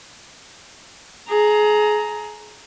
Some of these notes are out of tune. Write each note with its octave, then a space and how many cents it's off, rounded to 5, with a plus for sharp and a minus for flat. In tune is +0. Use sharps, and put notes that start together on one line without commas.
G#4 +25 A#5 +0